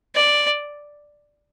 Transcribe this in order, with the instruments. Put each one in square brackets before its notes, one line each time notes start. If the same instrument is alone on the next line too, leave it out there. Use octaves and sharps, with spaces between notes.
[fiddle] D5